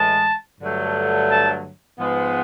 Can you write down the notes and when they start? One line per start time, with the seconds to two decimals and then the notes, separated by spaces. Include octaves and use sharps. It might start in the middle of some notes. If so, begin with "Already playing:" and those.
Already playing: A2 E3 G#3 A5
0.61 G2 D3 F#3 A3
1.30 A5
1.98 G#2 F3 G#3 B3